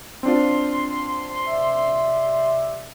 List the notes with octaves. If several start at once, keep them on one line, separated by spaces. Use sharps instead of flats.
C4 D4 F4 C6
C3 D5 E5